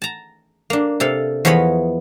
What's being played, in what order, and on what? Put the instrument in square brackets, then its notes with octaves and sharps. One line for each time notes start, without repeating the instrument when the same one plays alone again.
[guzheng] A5 A#5
A#3 D4
C3 A4 F5
E2 F3 B3 C#5 D#5 B5